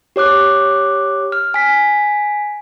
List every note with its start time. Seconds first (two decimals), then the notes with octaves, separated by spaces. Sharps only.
0.16 G4 C#5 D6 F#6
1.32 F6
1.54 G#5 B6